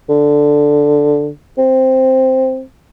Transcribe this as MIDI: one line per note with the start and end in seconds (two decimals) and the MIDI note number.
0.09 1.30 50
1.58 2.62 60